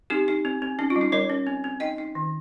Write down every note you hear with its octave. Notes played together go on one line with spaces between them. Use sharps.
C4 D#4 G4
D#4
C4
C4
C#4 D#4
F4
G3
D#4
G3 A#4 C#5
C#4
C4
C4
D#4 D#5 G5
D#4
D#3